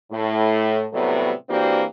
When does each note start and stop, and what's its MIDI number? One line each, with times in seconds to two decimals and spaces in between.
0.12 0.84 45
0.93 1.32 45
0.93 1.32 48
0.93 1.32 54
0.93 1.32 55
0.93 1.32 57
0.93 1.32 59
1.49 1.83 52
1.49 1.83 58
1.49 1.83 60
1.49 1.83 62
1.49 1.83 66
1.49 1.83 67